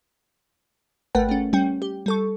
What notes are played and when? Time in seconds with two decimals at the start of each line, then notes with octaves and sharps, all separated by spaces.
1.15 G#1 A3 A#4 B4 F#5 G5
1.29 A3 C#4
1.53 G3 C#4 G5
1.82 G4
2.06 G3 A4 C#6